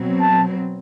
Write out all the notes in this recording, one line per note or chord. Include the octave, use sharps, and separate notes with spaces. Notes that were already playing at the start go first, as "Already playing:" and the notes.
Already playing: B2 F#3 C4
A5